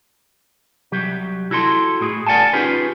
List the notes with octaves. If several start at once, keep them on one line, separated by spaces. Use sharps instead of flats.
C2 F#3 G4
E4 F#4 A4 C6
A2 G#4
A#4 D5 F#5 G#5 A5
C#4 D#4 F4 G4 G#4 B4